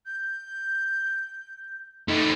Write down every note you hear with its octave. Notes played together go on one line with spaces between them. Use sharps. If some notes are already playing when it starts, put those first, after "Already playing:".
G6
A3 D#4 B5